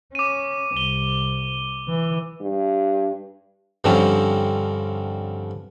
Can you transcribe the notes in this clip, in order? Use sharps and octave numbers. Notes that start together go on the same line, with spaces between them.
C#4 D6 D#7
C2 G7
E3
G2
G2 D3 F3 C4 C#4